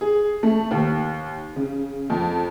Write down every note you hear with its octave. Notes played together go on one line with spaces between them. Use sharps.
G#4
A3
D#2
C#3
F2